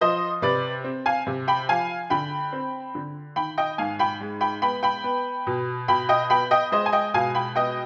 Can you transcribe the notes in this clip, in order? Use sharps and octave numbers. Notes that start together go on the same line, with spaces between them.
F3 C5 D#5
C3 B4 D5
C4
F5 G#5
C3
G5 B5
F3 F5 G#5
D3 G5 B5
C4
D3
D#3 G5 B5
D#5 G5
G#2 F5 G#5
G5 B5
G#3
G5 B5
B3 G5 B5
G5 B5
B3
B2
B2 G5 B5
D#5 G5
B3 G5 B5
D#5 G5
G#3 C5 D#5
G#5
D#5 G5
B2 F5 G#5
G5 B5
B3 D#5 G5